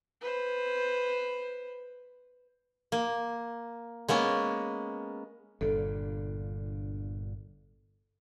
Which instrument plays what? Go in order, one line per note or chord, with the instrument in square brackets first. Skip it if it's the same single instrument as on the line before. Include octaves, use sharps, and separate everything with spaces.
[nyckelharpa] B4 C5
[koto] A#3
G#3 A#3 B3 C#4
[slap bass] G1 A#2 D3 [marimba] A4